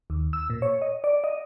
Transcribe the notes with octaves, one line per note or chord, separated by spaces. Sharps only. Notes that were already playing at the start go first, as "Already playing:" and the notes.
D#2
E6
A#2
C#5
D#5
D5
D#5